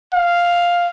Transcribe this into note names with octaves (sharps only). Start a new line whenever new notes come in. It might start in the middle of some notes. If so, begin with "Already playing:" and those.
F5